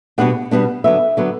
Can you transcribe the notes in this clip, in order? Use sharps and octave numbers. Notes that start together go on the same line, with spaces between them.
B2 G3 B3 D4 F#5
B2 G3 B3 D4
D3 F#3 B3 E5
D3 F#3 B3